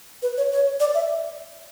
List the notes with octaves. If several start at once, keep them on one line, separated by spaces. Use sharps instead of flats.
B4
C#5
C#5
D5
E5